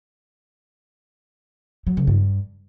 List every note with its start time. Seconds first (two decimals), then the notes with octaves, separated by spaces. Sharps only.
1.87 F#3
1.97 C#3
2.07 G2